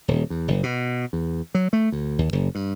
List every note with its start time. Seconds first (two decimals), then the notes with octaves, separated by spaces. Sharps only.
0.08 D#1
0.30 E2
0.48 F#1
0.63 B2
1.13 E2
1.55 F#3
1.73 A3
1.92 D2
2.18 D#2
2.33 F#1
2.55 G2